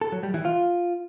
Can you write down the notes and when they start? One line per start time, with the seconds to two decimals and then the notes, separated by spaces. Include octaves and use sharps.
0.01 A4
0.12 F#3
0.23 G3
0.34 E3
0.45 F4